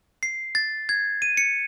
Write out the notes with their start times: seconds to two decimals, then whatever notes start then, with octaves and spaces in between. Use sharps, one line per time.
0.23 C7
0.55 A6
0.89 G#6
1.22 D#7
1.37 C#7